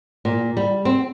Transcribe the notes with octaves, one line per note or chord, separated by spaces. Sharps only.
A#2
G3
C4